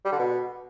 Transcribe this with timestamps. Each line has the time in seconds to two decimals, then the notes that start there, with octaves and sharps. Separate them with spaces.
0.05 G3
0.12 D3
0.19 B2